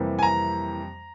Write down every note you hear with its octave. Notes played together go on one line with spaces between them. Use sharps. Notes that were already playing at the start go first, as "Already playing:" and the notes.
Already playing: F2 C3 E3 G3 A#3
G#5
A#5